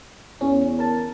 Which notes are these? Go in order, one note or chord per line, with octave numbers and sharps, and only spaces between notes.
E2 C#4
A#4 A5